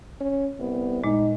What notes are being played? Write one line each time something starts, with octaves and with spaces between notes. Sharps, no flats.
C#4
C2 B3
A#2 G#3 D#4